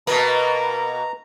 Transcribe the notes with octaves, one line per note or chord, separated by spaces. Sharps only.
B2 A#3 A#4 B4 A#5